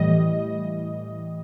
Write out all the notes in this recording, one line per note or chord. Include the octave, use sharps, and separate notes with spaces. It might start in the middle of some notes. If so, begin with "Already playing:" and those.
Already playing: A2 E3 G3 D#5